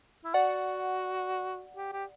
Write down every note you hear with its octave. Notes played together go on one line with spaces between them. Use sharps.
E4
F#4 D5 F#5
G4
G4